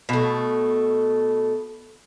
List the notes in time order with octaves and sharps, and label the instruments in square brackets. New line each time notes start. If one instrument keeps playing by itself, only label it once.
[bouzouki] B2 A3